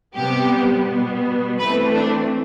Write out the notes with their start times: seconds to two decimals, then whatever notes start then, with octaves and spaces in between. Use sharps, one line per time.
0.15 C3 G3 B3 G4
0.86 B2 G3 B3
1.58 E3 A3 C4 B4
1.95 D4